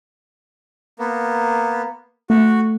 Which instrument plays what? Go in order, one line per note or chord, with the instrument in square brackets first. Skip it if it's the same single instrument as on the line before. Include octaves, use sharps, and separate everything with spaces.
[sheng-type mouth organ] A#3 B3
[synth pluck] A3 [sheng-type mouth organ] F#4